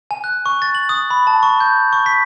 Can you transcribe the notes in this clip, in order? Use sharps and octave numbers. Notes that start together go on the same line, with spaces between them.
G#5
F#6
C#6
A6
F#7
D#6
B5
A5
C#6
G6
C#6
B6